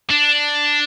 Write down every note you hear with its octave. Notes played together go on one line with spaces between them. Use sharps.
D4